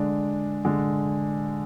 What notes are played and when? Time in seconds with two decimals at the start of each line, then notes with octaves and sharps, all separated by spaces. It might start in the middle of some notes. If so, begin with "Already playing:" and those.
Already playing: D3 G#3 D4
0.65 D3 G#3 D4